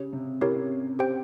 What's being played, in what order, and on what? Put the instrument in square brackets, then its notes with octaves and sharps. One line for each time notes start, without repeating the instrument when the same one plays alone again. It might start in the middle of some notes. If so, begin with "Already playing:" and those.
Already playing: [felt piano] C#3 [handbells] G4 C#5
[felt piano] C3
[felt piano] C3 [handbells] E4 G4 A#4 C#5
[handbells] G4 C5 G5